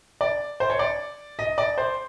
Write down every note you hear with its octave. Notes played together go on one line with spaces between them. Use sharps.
D5
C5
C#5
D5
D#5
D5
C5